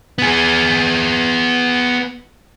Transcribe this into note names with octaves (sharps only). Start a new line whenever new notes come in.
B3 G#4